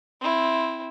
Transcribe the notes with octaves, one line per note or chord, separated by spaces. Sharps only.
C4 E4